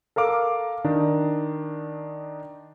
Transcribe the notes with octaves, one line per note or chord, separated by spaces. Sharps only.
A4 A#4 F5 D6
D#3 D4 D#4